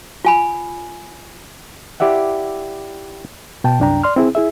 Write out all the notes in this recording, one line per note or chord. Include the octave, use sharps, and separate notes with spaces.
F4 G#5 B5
E4 G4 D5 E5 F#5
B2 G5 A5
C2 F#2 D4 G5 A#5
D5 C6 F6
C4 E4 G#4
E4 G#4 E5